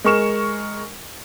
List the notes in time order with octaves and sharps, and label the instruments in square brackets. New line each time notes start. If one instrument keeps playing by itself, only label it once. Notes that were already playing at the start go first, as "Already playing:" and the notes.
[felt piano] G#3 A#4 C#6 E7